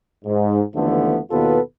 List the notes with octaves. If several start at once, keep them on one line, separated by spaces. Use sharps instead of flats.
G#2
D#2 D3 E3 F3 A3 B3
D#2 B2 B3 F4 A4 B4